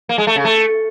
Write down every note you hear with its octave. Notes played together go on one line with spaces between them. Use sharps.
A#3
G#3
A3
C#3
A3